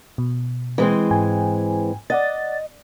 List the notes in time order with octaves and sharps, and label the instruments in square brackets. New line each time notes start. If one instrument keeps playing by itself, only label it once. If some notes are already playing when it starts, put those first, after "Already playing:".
[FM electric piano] B2
[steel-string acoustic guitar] E3 G#3 C4
[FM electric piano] G#2 G5 G#5
[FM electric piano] D5 F#5 A6 [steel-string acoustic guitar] D#5